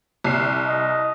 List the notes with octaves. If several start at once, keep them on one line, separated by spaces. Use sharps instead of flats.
C2 C7
D#5